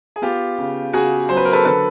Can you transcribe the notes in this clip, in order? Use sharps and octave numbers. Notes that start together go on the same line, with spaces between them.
G#4
B3 F4 G4
C#3
C#3 F#4 G#4
F#3 C5
B4
A#4
A4 B4
D3 A4 B4